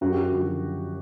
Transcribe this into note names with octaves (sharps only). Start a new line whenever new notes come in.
F#2 F#4
G4
F#4
D3 F3